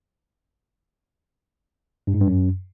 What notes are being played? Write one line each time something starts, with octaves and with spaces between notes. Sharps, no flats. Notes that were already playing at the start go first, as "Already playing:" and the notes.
G2
G#2
G2
F#2